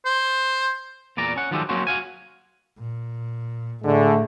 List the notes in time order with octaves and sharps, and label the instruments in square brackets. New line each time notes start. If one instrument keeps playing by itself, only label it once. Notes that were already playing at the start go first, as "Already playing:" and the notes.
[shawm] C5
[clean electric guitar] E2 A#2 D5 A#5
C#4 F#5
D#3 F3 F#3 G#3 G4 A4
F#3 A#3 C4 C#4 F#4 C5
F#4 F5 G#5
[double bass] A#2
[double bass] A2 [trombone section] D3 G#3 [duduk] A3